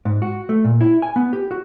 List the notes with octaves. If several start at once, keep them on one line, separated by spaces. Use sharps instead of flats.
G#2
F#4
A3
A#2
E4
G#5
B3
G4
F#4